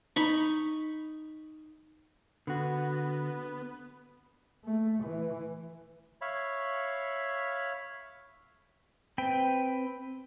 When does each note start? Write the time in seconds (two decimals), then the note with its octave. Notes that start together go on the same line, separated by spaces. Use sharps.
0.16 D#4 B5 C#6
2.47 D3 B3 F#4
4.65 A3
5.04 E3
6.21 C#5 E5 F5 B5
9.18 C4 B4 G5